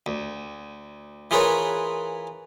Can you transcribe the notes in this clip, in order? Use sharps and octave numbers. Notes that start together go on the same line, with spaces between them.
D2
E3 F4 G#4 A#4 B4 C#5